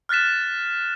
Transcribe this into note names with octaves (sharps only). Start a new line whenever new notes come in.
F6 F#6 A6 B6 E7